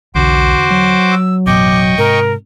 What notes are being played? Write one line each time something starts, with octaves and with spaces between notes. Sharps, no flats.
B1 E2 D3 F#4 C5 D6
F#3
E6
A1 F#2 B2 D#5 G5 C#6 D6
G#2 C3 A#4